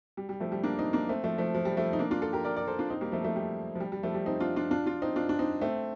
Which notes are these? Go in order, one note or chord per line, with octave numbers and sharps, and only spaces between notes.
G3
G3
F3 A3
G3
A#3 D4
C4 D#4
A#3 D4
A3 C4
F3 A3
F3 A3
F3
G3
F3 A3
D#4
A#3 D4
D4 F4
F4 A4
G4 A#4
A#4 D5
A#4 D5
A4 C5
D4 F4
C4 D#4
G3 A#3
F3 A3
F3 A3
G3
F3
G3
G3
F3 A3
G3
C4 D#4
D4 F4
D4 F4
D4 F4
D4 F4
C4 D#4
D4 F4
D4
C4 D#4
A3 C4